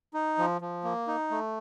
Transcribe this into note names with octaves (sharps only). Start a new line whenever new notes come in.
D#4
F3
F3
A#3
D#4
A3